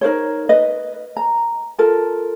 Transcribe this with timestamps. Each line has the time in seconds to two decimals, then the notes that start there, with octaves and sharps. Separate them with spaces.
0.01 D#4 A#4 C5 C#5
0.49 B4 D#5
1.17 A#5
1.78 F4 A4 A#4